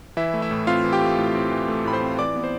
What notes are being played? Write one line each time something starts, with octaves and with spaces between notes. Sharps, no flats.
E3 E4 E5
A3
E4 E5
A2
C4 F4 F5
E3
G4 G5
A3
A2
C4
E3
A3
A2 B5
C5 C6
C4
E3 D5 D6
B3
C5